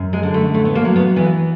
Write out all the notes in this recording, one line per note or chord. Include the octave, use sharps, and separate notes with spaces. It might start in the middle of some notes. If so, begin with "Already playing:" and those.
Already playing: F#2
G#3
D3
A3
A2 A3
B3
A#3
F#3
B3
E3 B3